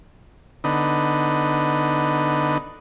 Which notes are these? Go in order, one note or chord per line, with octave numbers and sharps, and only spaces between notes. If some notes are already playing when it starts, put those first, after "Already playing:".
D3 B3 D#4